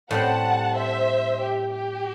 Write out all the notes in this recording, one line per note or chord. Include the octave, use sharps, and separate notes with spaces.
A2 G3 C4 F#5 A5
C5 E5
G4
G4